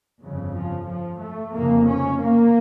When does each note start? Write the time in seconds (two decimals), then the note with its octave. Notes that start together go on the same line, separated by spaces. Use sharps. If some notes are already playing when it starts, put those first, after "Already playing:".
0.20 G1 F2 C#3
0.54 F3
0.87 F3
1.20 A3
1.54 F1 F2 C#3 A#3
1.87 C#4
2.21 A#3